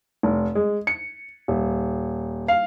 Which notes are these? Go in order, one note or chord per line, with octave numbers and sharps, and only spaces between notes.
F1
G#3
C#7
D#1
F5